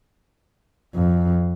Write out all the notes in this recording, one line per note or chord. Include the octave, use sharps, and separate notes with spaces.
F2